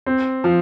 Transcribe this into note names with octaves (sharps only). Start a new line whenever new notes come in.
C4
F3